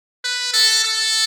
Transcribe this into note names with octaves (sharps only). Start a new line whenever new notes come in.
B4
A4
A4